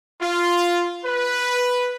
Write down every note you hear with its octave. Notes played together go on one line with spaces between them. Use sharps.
F4
B4